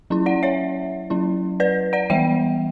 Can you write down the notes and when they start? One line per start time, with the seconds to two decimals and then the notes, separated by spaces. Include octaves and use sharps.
0.10 F#3 C#4 E4
0.26 D5 F#5
0.43 C#5 E5
1.10 F#3 C#4 E4
1.60 B4 D5
1.93 D5 F#5
2.10 E3 G3 B3 E5 G5